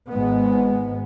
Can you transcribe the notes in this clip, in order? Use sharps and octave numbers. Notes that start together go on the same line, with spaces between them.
G#1 G#2 G#3 B3